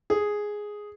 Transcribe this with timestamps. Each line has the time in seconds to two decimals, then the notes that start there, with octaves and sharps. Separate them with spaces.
0.10 G#4